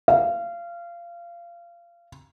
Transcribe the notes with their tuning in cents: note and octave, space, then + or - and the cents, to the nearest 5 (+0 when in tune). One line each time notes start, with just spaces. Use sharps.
F5 -25